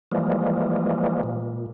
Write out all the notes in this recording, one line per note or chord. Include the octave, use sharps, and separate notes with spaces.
E3 F3 G3 G#3 A#3
A#2